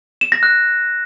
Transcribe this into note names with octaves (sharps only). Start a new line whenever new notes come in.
E7
A#6
F#6